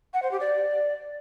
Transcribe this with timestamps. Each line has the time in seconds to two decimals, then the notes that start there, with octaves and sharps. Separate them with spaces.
0.14 F#5
0.22 C5
0.31 G4
0.40 D5